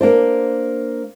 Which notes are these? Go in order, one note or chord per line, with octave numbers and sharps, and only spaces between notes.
A#3 D4 C5